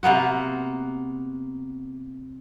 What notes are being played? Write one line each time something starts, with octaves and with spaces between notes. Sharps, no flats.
C3 A#3 B3 F#4